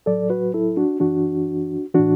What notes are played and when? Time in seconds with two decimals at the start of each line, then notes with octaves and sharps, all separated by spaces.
0.06 A2 F#3 A4 D5
0.30 F#4 B4
0.54 E4 A4
0.77 D4 F#4
1.00 F#2 E3 D4 F#4
1.94 A2 E3 D4 F#4